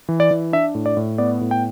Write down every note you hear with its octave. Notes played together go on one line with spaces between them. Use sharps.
E3
D5
E3
D4 E5
A2
D5
A2
B3 D5
A2
G5